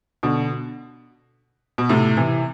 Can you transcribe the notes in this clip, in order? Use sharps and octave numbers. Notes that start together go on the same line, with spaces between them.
B2 D3
B2
A2 C3
C3 E3